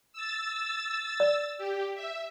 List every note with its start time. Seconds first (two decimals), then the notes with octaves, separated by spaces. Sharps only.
0.13 E6 A6
1.20 D5
1.58 G4
1.94 E5